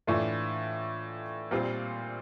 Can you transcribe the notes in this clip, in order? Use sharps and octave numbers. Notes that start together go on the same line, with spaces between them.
A2 E3 A3 D4 F4
A#2 G3 C4 F4